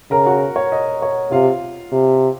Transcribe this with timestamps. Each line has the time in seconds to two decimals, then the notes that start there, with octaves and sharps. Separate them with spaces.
0.11 C#3 A#4 A#5
0.26 F#4 F#5
0.56 C#5
0.72 D#5
1.02 C#5
1.31 C3 F4 F5
1.92 C3